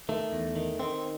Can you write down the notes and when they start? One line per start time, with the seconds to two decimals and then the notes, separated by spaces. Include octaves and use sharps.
0.09 D#3 A3
0.33 E2
0.56 D#3
0.80 D#3 C4